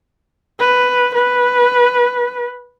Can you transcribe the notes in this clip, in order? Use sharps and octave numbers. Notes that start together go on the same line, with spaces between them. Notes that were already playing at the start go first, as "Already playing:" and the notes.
B4
B4